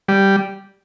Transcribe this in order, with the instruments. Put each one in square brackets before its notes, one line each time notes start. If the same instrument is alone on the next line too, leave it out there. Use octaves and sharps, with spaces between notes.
[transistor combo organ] G3